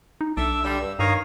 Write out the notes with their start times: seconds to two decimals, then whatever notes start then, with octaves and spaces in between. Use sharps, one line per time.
0.21 D#4
0.37 B1 D4 A4 E5 E6
0.64 D3 G3
0.80 G2
0.99 G2 D#3 C#5 F5 A#5 D#6